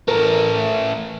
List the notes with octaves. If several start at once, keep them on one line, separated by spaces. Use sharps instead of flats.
E3 A3 A#4